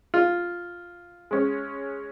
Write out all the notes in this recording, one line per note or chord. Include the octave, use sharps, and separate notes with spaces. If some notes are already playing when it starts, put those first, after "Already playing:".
F4
G#3 C#4